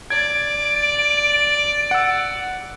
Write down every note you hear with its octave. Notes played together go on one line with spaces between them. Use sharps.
D5 G#6 D7
F#5 E6